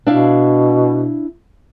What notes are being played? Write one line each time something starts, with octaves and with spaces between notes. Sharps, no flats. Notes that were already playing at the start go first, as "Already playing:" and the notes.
B2 D4 E4 F5